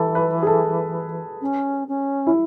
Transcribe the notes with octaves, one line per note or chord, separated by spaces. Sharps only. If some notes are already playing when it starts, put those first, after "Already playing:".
Already playing: E3 A4
B4
G#4
A4
C#4
C#4
E4